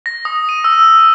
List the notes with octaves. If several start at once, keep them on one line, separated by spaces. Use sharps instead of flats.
A#6
D#6
D#7
E6